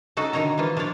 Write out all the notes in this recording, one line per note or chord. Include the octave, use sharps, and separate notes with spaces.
C#3 D#4 F#4 A4
D3 D#3 D#4 C#5 A#5
E3 F3 A#3 F4
F3 A#3 D4 C#5 D5